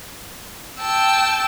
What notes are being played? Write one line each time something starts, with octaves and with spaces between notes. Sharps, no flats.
G5 A5 E6